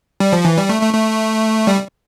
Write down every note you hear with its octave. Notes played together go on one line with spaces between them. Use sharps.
G3
F3
E3
G3
A3
A3
A3
G3